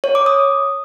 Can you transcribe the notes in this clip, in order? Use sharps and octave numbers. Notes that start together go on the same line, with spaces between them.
C#5
D6
D#6